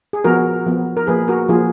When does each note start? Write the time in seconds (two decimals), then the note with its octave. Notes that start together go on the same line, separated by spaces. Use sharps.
0.13 G#4
0.24 F3 B3 F#4 A#4
0.66 F3 B3
0.97 A#4
1.07 F3 A#3 G#4 B4
1.28 F#4 A#4
1.49 F3 F4 G#4
1.52 A#3